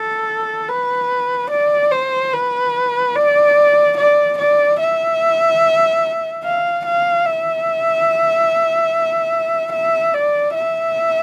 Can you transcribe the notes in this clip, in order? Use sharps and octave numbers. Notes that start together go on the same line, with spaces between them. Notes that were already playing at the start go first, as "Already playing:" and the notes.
Already playing: A4
B4
D5
C5
B4
D5
D5
D5
E5
F5
F5
E5
E5
D5
E5